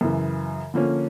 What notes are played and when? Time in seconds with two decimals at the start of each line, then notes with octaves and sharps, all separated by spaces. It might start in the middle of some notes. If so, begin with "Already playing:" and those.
0.01 F#2 C#3 E3
0.74 D3 F3 A#3 C#4